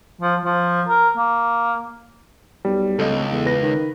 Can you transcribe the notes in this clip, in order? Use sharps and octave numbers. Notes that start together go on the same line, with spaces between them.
F3
F3
A#4
A#3
B1 G3
D1 C#2 A4 D#5
E2
B4 A#6
D#3